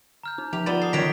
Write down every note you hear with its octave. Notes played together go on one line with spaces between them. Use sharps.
A#5 F6 G6
D#4
F3 G4 F7
B3 F4 D5 A6 E7 G7
A4 D6 D#6 C7
D#3 F#3 A#5 B6 D7 F7